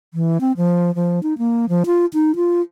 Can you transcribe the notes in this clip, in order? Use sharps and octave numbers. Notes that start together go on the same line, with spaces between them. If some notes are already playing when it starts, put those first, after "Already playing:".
E3
C4
F3
F3
D#4
A#3
F3
F4
D#4
F4